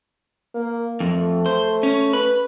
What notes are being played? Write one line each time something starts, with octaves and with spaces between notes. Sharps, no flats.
A#3
F2 A3
C5
C#4
B4